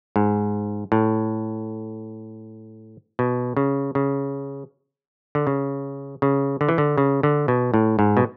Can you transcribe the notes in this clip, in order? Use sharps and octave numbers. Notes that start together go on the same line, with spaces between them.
G#2
A2
B2
C#3
C#3
D3
C#3
C#3
D3
E3
D3
C#3
D3
B2
A2
G#2
B2